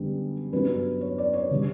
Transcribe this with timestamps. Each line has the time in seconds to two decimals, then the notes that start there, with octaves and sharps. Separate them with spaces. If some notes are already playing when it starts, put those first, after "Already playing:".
Already playing: F#2 D3 G3 B3 D4
0.53 G2 F#3 B3 D4 B4
1.01 C#5
1.18 D5
1.33 C#5
1.51 D3 G3